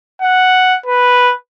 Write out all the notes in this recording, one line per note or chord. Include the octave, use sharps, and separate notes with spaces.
F#5
B4